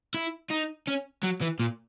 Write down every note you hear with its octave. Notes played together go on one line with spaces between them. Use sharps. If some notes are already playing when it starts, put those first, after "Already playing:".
E4
D#4
C#4
F#3
E3
A#2